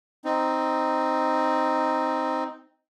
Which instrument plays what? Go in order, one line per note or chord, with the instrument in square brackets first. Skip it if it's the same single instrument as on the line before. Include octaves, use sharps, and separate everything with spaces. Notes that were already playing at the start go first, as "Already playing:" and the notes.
[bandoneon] C4 D#4